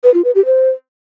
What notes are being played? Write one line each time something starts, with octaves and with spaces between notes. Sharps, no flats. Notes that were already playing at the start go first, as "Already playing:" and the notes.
B4
F4
B4
G4
C5